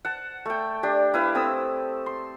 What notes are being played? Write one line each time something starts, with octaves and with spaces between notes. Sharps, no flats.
F#5 A5
A3 G5
D4 G4
E4 B4 F5
C4 A4 D#6 E6
C6